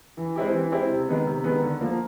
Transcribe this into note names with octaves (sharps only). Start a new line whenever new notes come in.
E3
G#3 C4 E4 G4
E3
G#3 C4 E4 G4
C3
D#3 G#3 B3
C3
D#3 G#3 B3
D3
F3 A#3